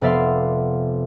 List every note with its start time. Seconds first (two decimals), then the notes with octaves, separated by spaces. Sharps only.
0.01 F1 B3 D5 E5 F5 C6